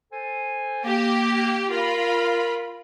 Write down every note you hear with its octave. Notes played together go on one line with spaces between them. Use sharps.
A4 C5 G#5
A#3 G4
F4 A#4 B5